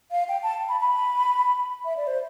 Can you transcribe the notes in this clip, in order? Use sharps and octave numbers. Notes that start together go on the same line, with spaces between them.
F5
G5
A5
B5
B5
E5
D5
C5